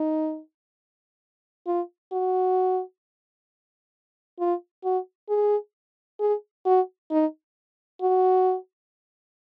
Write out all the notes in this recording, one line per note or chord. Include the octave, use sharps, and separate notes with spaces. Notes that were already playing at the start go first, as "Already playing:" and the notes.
Already playing: D#4
F4
F#4
F4
F#4
G#4
G#4
F#4
D#4
F#4